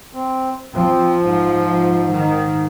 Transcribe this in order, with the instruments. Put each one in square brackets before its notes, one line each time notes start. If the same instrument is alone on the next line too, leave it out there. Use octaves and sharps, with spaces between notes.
[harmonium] C4
[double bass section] F3 [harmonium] C4
[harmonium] G#2
[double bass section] D#3